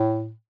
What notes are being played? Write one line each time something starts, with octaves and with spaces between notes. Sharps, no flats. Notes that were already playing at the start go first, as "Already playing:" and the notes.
Already playing: A2